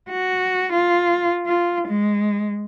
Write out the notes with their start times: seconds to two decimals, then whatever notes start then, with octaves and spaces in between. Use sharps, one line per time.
0.10 F#4
0.72 F4
1.46 F4
1.88 G#3